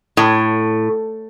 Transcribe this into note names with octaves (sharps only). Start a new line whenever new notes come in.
A2